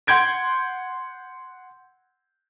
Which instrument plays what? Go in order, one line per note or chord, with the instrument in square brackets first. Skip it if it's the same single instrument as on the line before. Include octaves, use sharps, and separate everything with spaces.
[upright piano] F#5 C6 G6 G#6 D7